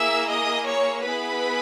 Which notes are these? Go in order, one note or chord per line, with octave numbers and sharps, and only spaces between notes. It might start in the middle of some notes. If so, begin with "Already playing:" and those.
Already playing: A#3 E4 G#4 E5 E6
D#5 D#6
C#5 C#6
B3 E4 G#4 B4 B5